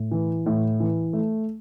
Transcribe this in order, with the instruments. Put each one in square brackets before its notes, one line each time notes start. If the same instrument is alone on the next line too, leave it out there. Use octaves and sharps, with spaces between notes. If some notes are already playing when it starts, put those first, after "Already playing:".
Already playing: [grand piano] A2
E3
A2
E3
A3